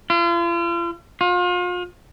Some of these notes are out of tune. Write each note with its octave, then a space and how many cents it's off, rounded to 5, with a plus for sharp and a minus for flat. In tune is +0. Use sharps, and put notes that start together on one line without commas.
F4 -40
F4 +35